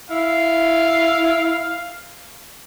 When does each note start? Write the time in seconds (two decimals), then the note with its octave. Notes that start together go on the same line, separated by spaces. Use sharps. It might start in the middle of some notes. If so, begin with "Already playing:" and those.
0.10 E4 F5